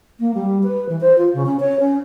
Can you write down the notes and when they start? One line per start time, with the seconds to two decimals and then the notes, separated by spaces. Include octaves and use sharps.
0.20 A#3
0.34 G3
0.63 B4
0.89 E3
1.01 C5
1.18 F4
1.34 C#3
1.46 C#4
1.60 C#5
1.80 C#4